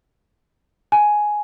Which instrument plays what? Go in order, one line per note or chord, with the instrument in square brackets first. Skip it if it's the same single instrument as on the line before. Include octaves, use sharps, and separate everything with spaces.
[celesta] G#5